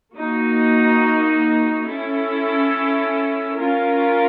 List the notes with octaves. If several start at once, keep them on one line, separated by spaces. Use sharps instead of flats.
A#3 D#4 F#4
C#4 E4 A4
C#4 F4 A#4